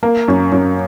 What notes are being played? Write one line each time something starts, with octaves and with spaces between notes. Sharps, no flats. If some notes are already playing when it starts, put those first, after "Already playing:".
A#3
F#2
F#2